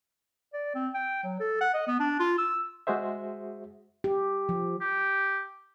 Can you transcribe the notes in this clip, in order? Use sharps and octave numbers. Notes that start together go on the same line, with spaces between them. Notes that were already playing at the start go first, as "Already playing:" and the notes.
D5
C4
G5
F#3
A4
F#5
D#5
B3
D4
F4
E6
G#3 F#4 G#4 C5 E5
G4
F3
G4